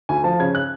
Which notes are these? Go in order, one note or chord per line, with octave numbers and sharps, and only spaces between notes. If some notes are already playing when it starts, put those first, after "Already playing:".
D2 G#5
F3 A5
C#3 G#6
F#6